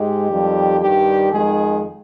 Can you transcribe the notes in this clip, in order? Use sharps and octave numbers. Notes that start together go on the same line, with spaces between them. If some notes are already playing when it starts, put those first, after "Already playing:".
Already playing: G#2 G#3 G4
F2 D#3 G3
G2 D#3 G3 G4
F2 D#3 G#3 G#4